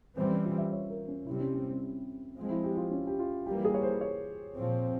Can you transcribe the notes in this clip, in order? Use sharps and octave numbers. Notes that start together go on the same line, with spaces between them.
E3 G3 C4 C5
C#4
F4
E5
C#5
A#4
C#4
C3 G3 C4 E4
C#4
C#4
C4
F3 G#3 C4
E4
G4
F4
C#4
G4
F4
E3 G3 A#3 G4
G#4
C#5
C5
C#5
A#2 F3 C4